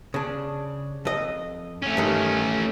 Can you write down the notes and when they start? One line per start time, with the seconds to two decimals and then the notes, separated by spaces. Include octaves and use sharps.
0.14 C#3 D4
1.05 F2 D#5
1.82 A3 C#4
1.97 G2 D#3